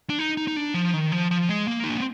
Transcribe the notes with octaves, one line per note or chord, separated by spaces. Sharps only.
D4
D#4
D#4
D#4
D4
F3
D#3
F3
F3
G#3
A#3
D#4
D4
C4